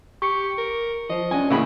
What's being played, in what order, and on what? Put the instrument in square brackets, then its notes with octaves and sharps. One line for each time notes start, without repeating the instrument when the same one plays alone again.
[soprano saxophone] G4 [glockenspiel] C#6 C#7
[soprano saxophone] A#4
[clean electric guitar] F3 [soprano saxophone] D#5
[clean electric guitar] F#2 D4 [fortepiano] G#5
[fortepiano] A2 C#3 B5 [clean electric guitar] E3 F#3 A#3 [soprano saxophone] F#4